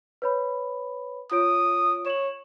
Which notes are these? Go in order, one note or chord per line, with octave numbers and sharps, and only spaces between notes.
B4 C#5 B5
F4 C#5 D#6 D7
C#5 E7 F#7